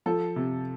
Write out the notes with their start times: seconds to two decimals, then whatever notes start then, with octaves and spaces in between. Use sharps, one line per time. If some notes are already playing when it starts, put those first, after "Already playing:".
0.06 F3 A4
0.36 C3